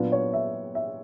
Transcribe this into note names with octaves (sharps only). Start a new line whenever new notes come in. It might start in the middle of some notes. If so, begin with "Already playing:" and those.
Already playing: A#2 F#3 B3 D4 F4
C#5
E5
E5